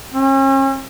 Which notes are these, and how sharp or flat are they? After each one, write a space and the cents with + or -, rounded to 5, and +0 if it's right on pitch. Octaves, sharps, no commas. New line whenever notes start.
C#4 -40